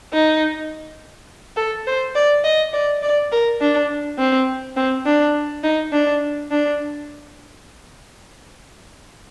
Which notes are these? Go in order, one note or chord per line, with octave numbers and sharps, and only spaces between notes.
D#4
A4
C5
D5
D#5
D5
D5
A#4
D4
C4
C4
D4
D#4
D4
D4